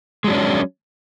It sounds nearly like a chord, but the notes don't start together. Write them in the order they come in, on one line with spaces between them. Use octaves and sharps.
G#3 F#3 D4 C#4